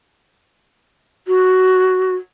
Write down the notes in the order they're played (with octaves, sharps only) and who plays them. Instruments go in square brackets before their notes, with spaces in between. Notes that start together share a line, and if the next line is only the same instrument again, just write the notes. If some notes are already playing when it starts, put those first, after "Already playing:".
[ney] F#4